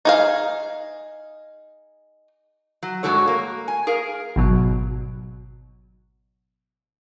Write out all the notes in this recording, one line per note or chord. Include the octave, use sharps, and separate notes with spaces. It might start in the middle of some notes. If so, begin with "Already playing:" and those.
D#4 G#4 F5
F#3
G2 D#3 G#3 F#4 A4 C#5
A#3
G#5
G#4 A#4 F5
G#1 B2 F#3